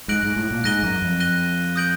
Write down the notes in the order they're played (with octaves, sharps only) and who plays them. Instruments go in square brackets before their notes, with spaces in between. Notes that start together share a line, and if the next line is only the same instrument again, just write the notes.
[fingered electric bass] G#2 [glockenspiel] F#6 A#6 D7 F#7
[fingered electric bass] G#2
A2
A#2
[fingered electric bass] G#2 [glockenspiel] F#6 A#6 D#7 G7
[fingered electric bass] F#2
F2
[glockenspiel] F#6 A#6 D#7 G7
D#6 G6 A#6 D7 F#7